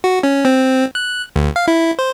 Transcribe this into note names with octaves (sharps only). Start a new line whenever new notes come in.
F#4
C#4
C4
F#6
D2
F5
E4
C5